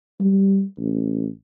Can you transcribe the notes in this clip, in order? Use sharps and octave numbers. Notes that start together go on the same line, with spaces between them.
G3
A1